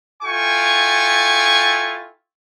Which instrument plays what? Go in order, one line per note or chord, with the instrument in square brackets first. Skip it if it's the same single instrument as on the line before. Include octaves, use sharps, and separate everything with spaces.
[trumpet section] E4 F4 A4 G5 G#5 C#6